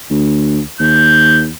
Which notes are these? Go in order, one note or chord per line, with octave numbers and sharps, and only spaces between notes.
D2
D#2 G6